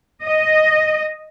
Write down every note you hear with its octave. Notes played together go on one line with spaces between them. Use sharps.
D#5